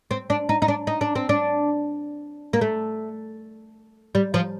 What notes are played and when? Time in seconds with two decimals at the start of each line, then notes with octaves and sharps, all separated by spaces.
0.11 C4
0.30 D4
0.49 D#4
0.62 D#4
0.68 D4
0.87 D#4
1.01 D4
1.15 C4
1.29 D4
2.53 A#3
2.61 A3
4.15 G3
4.34 F3